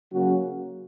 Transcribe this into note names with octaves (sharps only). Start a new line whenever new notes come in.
C#3 F#3 A#3 C#4 F#4